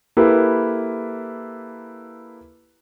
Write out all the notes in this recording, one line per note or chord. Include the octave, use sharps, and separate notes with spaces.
A#3 E4 G4 A4 B4